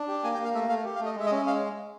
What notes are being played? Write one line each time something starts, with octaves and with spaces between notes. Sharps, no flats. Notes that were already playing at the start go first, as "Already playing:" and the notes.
Already playing: D4
G4
A#3 G#5
G5
A#3
F5
A3 E5
A3 F5
G4
F5
A3
D#5
G#3 E5
D#5
C#4
E5
G#3 F5